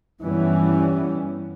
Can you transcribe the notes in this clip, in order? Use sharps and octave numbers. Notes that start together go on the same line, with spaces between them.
G2 E3 G3 B3 C#4